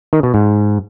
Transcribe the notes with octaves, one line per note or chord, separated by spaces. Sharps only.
D#3
B2
G#2